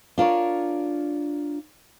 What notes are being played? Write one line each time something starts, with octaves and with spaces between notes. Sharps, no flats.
D4 F4 A#4 C#5